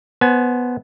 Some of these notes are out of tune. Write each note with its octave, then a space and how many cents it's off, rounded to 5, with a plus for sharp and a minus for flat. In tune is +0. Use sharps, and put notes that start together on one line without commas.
B3 +0 C5 +0 G#5 +35